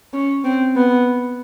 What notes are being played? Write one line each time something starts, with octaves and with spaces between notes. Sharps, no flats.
C#4
C4
B3